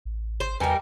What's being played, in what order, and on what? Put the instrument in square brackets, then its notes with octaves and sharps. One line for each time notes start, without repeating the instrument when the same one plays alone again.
[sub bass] A1
[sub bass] G#1 [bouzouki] C5
[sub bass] E2 [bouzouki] G3 D#4 A#4 [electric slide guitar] B4 G#5 A#5